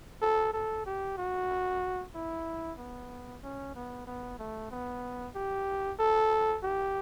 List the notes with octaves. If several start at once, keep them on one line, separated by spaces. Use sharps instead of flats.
A4
A4
G4
F#4
E4
B3
C#4
B3
B3
A3
B3
G4
A4
G4